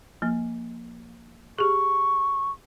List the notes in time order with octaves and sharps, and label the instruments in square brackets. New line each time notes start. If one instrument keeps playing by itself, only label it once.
[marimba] F3 A#3
[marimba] G4 G#4 [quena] C#6